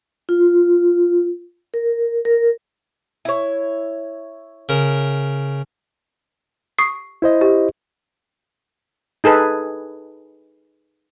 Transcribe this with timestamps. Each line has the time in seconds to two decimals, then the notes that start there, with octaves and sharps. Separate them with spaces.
0.29 F4
1.74 A#4
2.25 A#4
3.25 E4 C#5
4.69 C#3 A#4
6.79 C#6 D#6 C7
7.22 E4 C5 D#5
7.41 G4
9.24 D#4 G#4 A4 B4